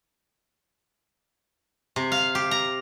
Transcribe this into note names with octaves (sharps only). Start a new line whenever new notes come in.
C3
F5
G4
A#5